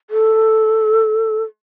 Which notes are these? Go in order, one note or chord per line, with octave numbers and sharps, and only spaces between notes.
A4